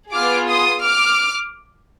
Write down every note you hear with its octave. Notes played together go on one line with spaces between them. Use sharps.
B3 F4 G#4 D6 F6
C6 D#6
D6 F6